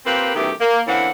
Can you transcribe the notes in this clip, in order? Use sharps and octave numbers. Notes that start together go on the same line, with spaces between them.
A#3 C4 F4 G4 A#4 B4
F#2 D#3 E3 A3 B3 G4
A#3
D3 E3 A#3 C4 C#4 F#5